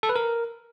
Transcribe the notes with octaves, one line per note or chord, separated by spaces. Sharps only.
A4
B4
A#4